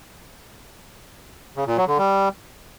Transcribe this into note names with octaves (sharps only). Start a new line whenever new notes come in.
C#3
A#2
F#3
D3
G3